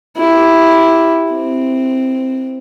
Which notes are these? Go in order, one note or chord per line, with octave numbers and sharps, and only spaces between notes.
E4 G4
C4